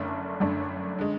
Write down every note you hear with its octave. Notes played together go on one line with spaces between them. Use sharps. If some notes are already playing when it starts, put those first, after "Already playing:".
Already playing: F#1 F#2 D3 A3 D4
F#1 F#2 D3 A3 D4
D3 G#3